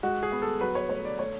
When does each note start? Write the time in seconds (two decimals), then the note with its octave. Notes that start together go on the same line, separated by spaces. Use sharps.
0.03 G#3 F#4
0.23 G#4
0.32 B3
0.42 A4
0.60 F#3 B4
0.75 C#5
0.89 A3 C#5
1.05 D5
1.19 A3 C#5